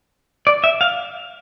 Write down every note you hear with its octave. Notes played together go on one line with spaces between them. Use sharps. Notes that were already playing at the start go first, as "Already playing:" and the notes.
D5
E5
F5